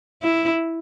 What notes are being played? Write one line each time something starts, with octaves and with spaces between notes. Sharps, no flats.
E4